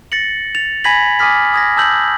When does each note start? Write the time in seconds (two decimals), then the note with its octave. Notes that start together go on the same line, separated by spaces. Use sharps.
0.12 A6 A#6 C#7 F#7
0.55 A6 F7
0.84 G#5 B5 G#6 A#6 B6 F#7
1.19 G#5 D6 D#6 F6 B6
1.54 D#6 G#6 A#6
1.77 A5 D#6 E6 G6 F#7